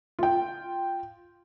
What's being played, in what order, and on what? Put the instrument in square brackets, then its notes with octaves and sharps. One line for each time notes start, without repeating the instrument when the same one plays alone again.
[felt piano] F4 G5